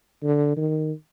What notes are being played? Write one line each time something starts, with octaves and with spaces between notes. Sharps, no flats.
D3
D#3